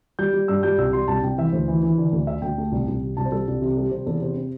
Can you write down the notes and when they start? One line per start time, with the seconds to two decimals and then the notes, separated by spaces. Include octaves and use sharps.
0.19 G3 G6
0.33 G3
0.48 G2 E6
0.63 G3 G6
0.78 C2 E6
0.93 G3 C6
1.08 C2 A5
1.23 C2 G5
1.38 E3 E5
1.53 D2 C5
1.68 E3
1.82 E3
1.98 D3
2.13 D2
2.27 D3 E5
2.42 D2 G5
2.58 A3
2.72 C2
2.88 C2
3.03 C3
3.17 C2 A5
3.25 C5
3.32 G3 A4
3.47 C2
3.62 C3
3.77 G3 A4
3.91 C3 C5
4.06 E2 A4
4.21 C3 C5
4.36 C4